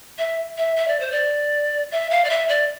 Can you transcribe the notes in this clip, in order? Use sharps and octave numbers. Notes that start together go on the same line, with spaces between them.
E5
E5
E5
D5
C5
D5
E5
F5
D5
E5
D5